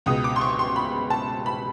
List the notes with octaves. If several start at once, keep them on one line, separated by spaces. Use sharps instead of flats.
C#2 B2 G#3 D#6
D6
C6
C#6
C6
B5
A5
B5